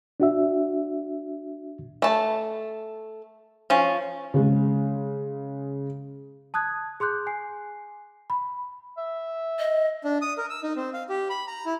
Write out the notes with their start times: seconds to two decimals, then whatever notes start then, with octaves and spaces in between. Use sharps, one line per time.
0.20 D4 F#4 E5
2.02 A3 A5
3.70 F3 C#4
4.34 C#3 G#3
6.54 A5 D#6 F#6 G#6
7.00 G#4 C6 D6 F#6 G6
7.27 G#5 C7
8.30 B5
8.97 E5
9.59 D#5
10.04 D4
10.22 D#6
10.38 A#4
10.50 E6
10.63 D#4
10.76 C4
10.93 F5
11.09 G4
11.30 B5
11.47 A#5
11.65 E4